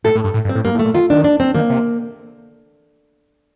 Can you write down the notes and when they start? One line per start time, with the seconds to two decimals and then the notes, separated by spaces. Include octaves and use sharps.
0.04 A2 A4
0.15 A2
0.24 G2
0.34 A2
0.45 G2
0.49 C4
0.55 A2
0.65 G2 A#3
0.75 A2
0.79 A3
0.85 A#2
0.94 D#3 F4
1.10 D#3 D4
1.24 D4
1.40 C4
1.55 D#3 A#3
1.70 C3